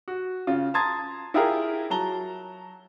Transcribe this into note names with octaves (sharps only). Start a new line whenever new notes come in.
F#4
C#3 F4
A5 A#5 C6 D#6 G#6 A6
E4 F4 G4 G#4 A#4
F#3 A5 A#5 G7